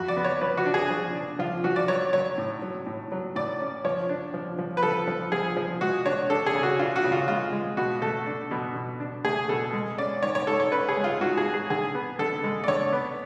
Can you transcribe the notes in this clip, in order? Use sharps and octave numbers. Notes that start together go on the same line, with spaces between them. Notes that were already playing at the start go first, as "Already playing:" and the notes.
Already playing: F2 F#4
D5
B3
C#5
F3 B4
F#4
D4
G#4
F3
D4
F3 F4
F3 F#4
D5
F#3 C#5
F#3 C#5
A2
F#3
A2
F#3
A2 D5
C#4
F3 C#5
D4
F3
F3
B4
F3 A4
F3
F3 G#4
F3
G#3 F#4
D4 C#5
D4 A4
G#4
C#3
F#4
D4 F4
F#4
C#3
F4
G#3 F4
G#3
B2 F#4
A3 A4
D4
B2
B2
D4
A3 G#4
B2 A4
G#3
C#4 D5
G#2 C#5
C#5
G#2 A4
C#5
C#4 B4
G#4
G#3
F4
G#2 F#4
G#4
G#2
G#4
D3 G#4
B3
D3 A4
G#3
D5
D3 C#5
B3